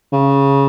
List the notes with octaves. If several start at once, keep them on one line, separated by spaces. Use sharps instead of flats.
C#3